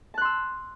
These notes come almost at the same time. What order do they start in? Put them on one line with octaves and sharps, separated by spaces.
A5 F#6 C6 E6